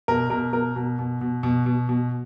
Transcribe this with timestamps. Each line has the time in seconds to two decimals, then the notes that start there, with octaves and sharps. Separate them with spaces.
0.08 B2 A#4
0.30 B2 A#4
0.53 B2 A#4
0.76 B2
0.99 B2
1.21 B2
1.43 B2
1.66 B2
1.89 B2